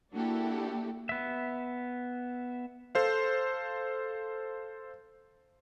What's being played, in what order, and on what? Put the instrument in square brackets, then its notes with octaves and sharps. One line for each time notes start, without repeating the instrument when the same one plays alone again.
[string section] A#3 D4 E4 F#4 G4 A4
[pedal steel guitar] B3 E5
[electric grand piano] A4 C5 F5